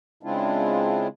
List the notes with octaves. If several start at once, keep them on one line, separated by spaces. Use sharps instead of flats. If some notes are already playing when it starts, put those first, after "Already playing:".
C#3 G#3 C4 D4 E4 F4